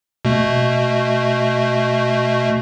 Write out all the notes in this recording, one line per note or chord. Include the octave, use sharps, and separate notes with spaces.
B2 A3